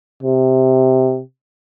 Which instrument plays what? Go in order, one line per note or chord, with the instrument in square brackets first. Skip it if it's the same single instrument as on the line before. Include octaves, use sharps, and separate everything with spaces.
[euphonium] C3